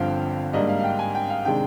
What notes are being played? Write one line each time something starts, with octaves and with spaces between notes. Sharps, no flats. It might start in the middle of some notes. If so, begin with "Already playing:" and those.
Already playing: G1 G2 D3 F3 C4 F5 G5
G#2 G3 A#3 D4 D#5
F5
F5
G5
G#5
G5
F5
C3 D#3 G#3 D4 G5